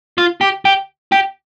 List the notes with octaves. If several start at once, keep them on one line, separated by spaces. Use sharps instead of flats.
F4
G4
G4
G4